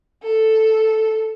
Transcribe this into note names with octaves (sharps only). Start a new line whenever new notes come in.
A4